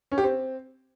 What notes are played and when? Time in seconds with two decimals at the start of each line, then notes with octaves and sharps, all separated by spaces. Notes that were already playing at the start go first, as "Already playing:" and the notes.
0.12 C#4
0.18 G4
0.24 C4